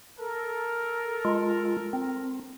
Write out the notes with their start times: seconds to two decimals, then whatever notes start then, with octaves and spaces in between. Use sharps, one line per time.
0.19 A4 A#4
1.25 G#3 F4
1.93 C4